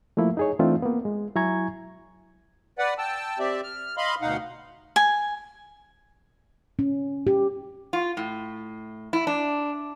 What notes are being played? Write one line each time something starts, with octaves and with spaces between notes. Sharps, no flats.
F3 A3 A#3 E4
D#4 G#4 C#5
E3 A3 C4 D4 D#4 F4
A#3 B3
G#3
F#3 E4 G#5 A#5 C#6 G#6
B4 D5 F#5
G5 A5 E6
C4 G4 D5 E5
F6
D#5 F5 B5 C6
D2 B2 D#4 F5 F#5
G#5
C#4
G4
F4
A2
E4
D4